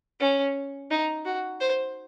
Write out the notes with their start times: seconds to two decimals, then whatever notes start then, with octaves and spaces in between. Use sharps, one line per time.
0.20 C#4
0.90 D#4
1.25 F#4
1.60 C5